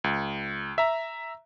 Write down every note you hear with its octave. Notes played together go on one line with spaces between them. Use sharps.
C#2
E5 A#5